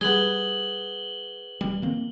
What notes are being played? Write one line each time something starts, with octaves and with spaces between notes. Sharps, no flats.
G3 B3 G#4 F#7 G7
D#1 G3
D#3 A#3 C4